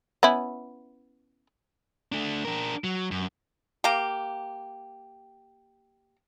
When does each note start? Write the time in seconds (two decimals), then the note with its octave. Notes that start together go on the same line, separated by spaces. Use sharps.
0.23 B3 C#4 E4
2.12 A3 D4
2.45 D4 A#4
2.84 F#3
3.11 F#2
3.84 A#3 G4